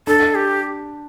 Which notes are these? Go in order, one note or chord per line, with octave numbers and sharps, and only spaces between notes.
D4 A4
G4